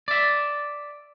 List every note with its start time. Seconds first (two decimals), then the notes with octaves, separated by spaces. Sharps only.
0.08 D5 E5